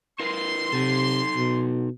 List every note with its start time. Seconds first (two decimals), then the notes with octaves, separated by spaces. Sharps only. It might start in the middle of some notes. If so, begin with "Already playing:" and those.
0.20 E4 A#4 B4 C6
0.73 C3 D#4 A4
1.36 B2